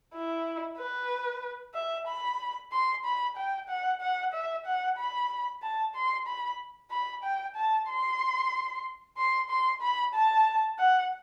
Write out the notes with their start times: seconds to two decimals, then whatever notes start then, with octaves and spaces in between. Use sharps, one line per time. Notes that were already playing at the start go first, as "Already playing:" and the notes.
0.14 E4
0.78 B4
1.75 E5
2.07 B5
2.72 C6
3.04 B5
3.36 G5
3.69 F#5
4.01 F#5
4.33 E5
4.66 F#5
4.98 B5
5.62 A5
5.95 C6
6.27 B5
6.91 B5
7.24 G5
7.55 A5
7.88 C6
9.17 C6
9.49 C6
9.81 B5
10.14 A5
10.79 F#5